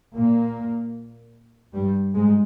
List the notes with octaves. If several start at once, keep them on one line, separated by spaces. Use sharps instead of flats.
A#2 A#3
G2 G3
G#2 G#3